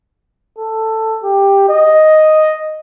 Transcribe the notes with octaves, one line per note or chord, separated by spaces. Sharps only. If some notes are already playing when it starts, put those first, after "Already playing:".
A4
G4
D#5